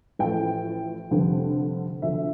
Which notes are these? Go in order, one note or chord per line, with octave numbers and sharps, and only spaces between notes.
A1 A2 F3 A3 G5
F1 F2 D3 G3
D2 D3 F3 A3 E5